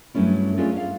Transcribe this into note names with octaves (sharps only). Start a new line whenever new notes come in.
G2 F#3 A3 C#4 E4
A3 C#4 D4 F4 G#4 A4
F5